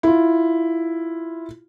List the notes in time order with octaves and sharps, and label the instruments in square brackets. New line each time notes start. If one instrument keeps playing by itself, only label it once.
[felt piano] E4 F4